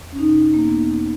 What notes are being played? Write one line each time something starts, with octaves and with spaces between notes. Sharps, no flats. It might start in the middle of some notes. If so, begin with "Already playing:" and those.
Already playing: E2
C#4
B2 D#4
A#3
E2 B3